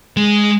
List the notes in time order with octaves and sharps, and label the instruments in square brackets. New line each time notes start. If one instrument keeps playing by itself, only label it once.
[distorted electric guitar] G#3